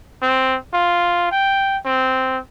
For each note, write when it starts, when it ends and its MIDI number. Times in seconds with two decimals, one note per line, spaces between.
0.22 0.56 60
0.74 1.29 65
1.32 1.77 79
1.85 2.38 60